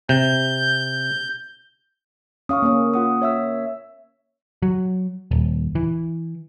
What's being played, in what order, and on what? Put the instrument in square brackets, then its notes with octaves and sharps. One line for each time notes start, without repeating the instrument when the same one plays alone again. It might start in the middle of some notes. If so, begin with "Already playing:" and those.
[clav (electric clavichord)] C3 [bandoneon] G6
[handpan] C#4 F5 [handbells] C#6 D#6
[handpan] A#3 C#4
[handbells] F4 F#5 D#6
C#5 E5 E6
[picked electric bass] F#3
D#1
E3